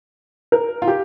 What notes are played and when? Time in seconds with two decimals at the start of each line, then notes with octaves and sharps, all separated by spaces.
0.52 A#4
0.82 F4
0.88 G4